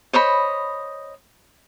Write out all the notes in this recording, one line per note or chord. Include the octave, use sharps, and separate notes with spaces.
C5 C#5 D#5 B5